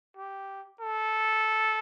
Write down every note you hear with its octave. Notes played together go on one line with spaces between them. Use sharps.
G4
A4